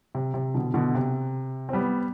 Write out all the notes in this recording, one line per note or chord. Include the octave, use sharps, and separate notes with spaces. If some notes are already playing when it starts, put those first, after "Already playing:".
C3
C3
B2 D3
B2 D3
C3
C4
G3 B3